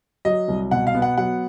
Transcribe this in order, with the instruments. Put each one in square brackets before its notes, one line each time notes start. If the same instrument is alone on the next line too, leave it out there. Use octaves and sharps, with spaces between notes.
[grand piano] F#3 [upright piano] D#5
[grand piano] C2
[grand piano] B2 [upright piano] F#5
[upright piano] F5
[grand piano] B3
[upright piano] F#5
[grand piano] F#3 [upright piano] F#5